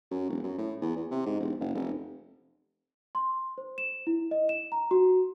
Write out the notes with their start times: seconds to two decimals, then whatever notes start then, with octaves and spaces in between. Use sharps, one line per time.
0.11 F#2
0.29 E1
0.44 F#2
0.58 A2
0.81 E2
0.96 E2
1.11 C3
1.26 G#2
1.40 E1
1.60 F#1
1.75 F1
3.15 C6
3.58 C5
3.78 E7
4.07 E4
4.31 D#5
4.49 E7
4.72 A#5
4.91 F#4